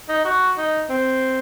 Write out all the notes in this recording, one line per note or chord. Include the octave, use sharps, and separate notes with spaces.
D#4
F#4
D#4
C4